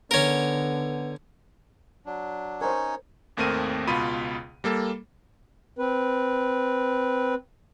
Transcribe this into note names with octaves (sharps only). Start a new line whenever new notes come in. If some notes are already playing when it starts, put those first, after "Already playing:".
D3 B3 C#4 A#4
F#3 D4
C#4 D#4 A#4 C5 C#5
G#1 D#2 A3 C4 A#4 D#7
C#2 B2 F4 B5 D#7
G3 A#3 A4
C4 B4